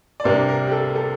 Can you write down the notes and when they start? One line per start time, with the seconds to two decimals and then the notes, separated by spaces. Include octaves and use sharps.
0.20 D5
0.24 C2 C3 G3 A#3 D4 C5
0.48 A#4
0.67 G4
0.72 A4
0.95 A4